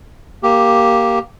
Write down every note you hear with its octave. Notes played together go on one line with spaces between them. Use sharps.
A#3 G4